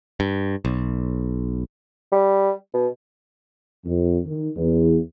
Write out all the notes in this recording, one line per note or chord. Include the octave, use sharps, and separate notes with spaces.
G2
B1
G3
B2
F2
D#3
E2